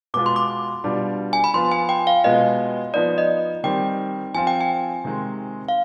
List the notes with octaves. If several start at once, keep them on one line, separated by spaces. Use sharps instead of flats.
B2 G#3 B3 F4 D6
C6
D6
B2 G3 D4 F4
G#5
B5
F3 B3 F4 C6
G#5
G5
F5
B2 G#3 B3 F4 D#5
F3 B3 D#4 D5
D#5
D#3 G3 C4 G5
F3 C4 F4 G#5
G5
G#5
C3 D#3 G#3 C4
F5